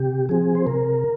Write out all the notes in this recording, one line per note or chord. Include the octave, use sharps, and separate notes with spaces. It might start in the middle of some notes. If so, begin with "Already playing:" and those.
Already playing: C3 G4
F3 C4 G#4
C5
C3 A#4